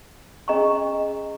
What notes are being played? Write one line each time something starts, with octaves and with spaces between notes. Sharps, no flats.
C#4 G#4 D#5 A#5 C#6